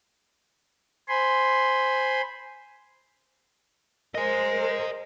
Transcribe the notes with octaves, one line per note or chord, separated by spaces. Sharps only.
C5 G#5 B5 C6
A#4 C5 D#5 G#5